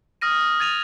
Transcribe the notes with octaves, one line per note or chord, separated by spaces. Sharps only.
D#6 F6 A#6 D#7
G#6 A6 D#7 F7